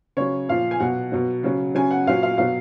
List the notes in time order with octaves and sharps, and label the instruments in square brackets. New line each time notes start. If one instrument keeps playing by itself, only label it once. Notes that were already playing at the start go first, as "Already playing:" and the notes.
[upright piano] C#3 F#3 C#5
A#2 F3 F5
G#5
B2 F#3 F#5
B2 F#3
C#3 F#3
C#3 F#3 G#5
F#5
A#2 F#3 F5
F5
B2 F#3 F5